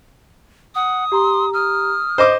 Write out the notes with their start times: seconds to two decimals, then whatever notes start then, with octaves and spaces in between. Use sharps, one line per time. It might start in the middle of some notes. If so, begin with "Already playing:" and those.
0.75 F#5 D#6
1.12 G4 A#5 C6
1.53 D#6 F6
2.18 C5 D#5 D6